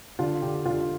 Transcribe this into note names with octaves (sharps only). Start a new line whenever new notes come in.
D3 F4
D3 G4
D3 F4